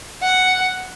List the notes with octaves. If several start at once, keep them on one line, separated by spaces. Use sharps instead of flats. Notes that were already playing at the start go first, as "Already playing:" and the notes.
F#5